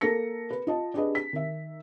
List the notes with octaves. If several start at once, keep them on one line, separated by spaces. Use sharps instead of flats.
A#3 A4 A#4 A#6 C#7
B4
F4 D#5 A5
D4 G4 G#4 B4 D#5
B6
D#3 E5